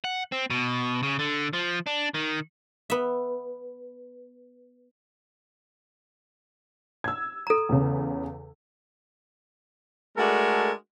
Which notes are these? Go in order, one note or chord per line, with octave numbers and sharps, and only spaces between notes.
F#5
C4
B2
C#3
D3
F3
D4
D#3
B3 E5
E6 G#6
A4 A#5
E2 C#3
G#3 A3 D4 F#4 A4 A#4